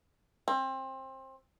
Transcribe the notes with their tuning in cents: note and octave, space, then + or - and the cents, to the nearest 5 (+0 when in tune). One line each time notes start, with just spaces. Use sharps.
C4 +25